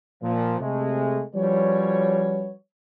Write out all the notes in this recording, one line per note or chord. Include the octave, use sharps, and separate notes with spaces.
A#2 F3
C3 G#3 A3 G#4
F3 G3 C#4 F#4 B4 C#5